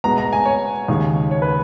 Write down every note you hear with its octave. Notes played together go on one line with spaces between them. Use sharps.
B2 G#3 B3 A#5
A#5
G#5
C#5
D#2 C#3 G#3 D#4
C#5
B4